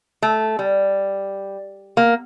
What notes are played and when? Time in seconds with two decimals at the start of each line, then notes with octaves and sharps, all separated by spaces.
0.22 A3
0.59 G3
1.97 A#3